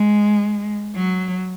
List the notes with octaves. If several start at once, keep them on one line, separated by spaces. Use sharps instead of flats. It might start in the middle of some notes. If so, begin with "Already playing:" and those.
Already playing: G#3
F#3